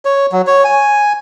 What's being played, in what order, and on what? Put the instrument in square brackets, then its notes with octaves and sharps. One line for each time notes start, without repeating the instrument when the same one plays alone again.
[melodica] C#5
F#3
C#5
G#5